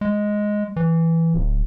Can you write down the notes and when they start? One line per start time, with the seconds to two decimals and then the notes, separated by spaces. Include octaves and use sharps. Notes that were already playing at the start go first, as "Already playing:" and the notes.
0.01 G#3
0.76 E3
1.34 D1